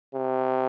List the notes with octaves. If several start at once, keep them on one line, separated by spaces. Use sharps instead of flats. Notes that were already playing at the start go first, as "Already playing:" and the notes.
C3